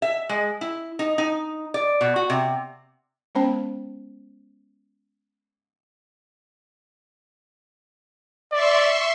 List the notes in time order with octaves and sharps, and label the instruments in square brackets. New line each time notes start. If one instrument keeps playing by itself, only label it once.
[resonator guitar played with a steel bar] E5
G#3
E4
D#4
D#4
D5
B2
F#4
C3
[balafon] G#3 B3 C#4 C5 G5 A5
[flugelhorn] D5 [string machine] E5 C6 C#6